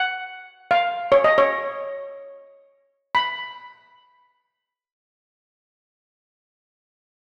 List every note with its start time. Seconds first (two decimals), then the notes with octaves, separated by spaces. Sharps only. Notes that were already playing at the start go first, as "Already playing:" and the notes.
Already playing: F#5
0.71 F5
1.12 C#5
1.24 D#5
1.38 C#5
3.15 B5